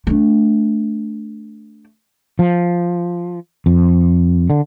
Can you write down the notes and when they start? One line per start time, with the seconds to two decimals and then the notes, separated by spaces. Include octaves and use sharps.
0.07 A3 D4
2.39 F3
3.66 F2
4.50 D3